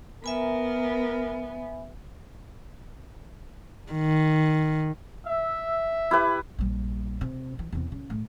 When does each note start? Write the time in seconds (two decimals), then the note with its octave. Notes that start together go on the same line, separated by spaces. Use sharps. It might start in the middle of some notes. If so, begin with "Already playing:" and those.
0.24 B3 A#4 E5 G#5 B5
3.92 D#3
5.27 E5
6.11 E4 G4 B4
6.59 A#1 G3
7.21 C3
7.59 E3
7.72 E2 C3
7.92 C#3
8.10 A2